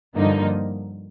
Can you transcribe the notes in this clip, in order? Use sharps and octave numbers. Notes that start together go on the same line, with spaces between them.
G2 D3 F3 A#3 D#4